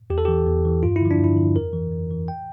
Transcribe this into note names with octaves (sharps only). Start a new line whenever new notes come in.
E2 G4
A4
E3 G4
E2
E3
G2 F4
E4
D3 F3
D4
G2
E4
D3 F3
F2 A#4
E3
F2
E3
G5